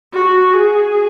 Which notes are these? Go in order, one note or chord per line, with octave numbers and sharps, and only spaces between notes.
F#4
G#4